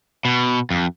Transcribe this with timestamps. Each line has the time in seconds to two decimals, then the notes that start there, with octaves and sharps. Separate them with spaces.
0.25 B2
0.71 F2